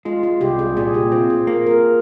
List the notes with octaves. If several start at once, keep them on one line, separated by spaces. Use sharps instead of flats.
G#3 F4
F4
C2 G4
G#4
A#2 G#4
G4
C4 F4
G#4
A#3 F4
A#4
G#4